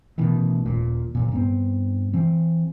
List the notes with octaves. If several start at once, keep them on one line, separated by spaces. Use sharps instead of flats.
A1 B2 D#3 E3
D#1 A#2
D1 A#2
G2 B3 C4
E3 C4